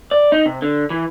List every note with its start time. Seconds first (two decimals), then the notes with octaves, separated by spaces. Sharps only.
0.11 D5
0.32 D#4
0.46 C3
0.62 D3
0.90 E3